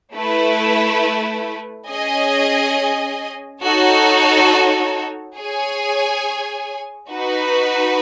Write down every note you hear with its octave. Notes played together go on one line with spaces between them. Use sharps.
A3 E4 B4
C#4 G#4 D#5 G#5
D#4 F#4 A4 C#5
G#4 C#5 G#5
D#4 F#4 B4